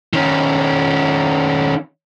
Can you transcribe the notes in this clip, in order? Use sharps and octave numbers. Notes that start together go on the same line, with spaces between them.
D#3 C#4